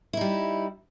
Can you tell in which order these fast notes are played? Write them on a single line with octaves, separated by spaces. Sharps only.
E4 D#4 G3